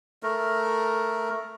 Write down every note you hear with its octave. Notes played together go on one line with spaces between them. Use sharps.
A3 A#4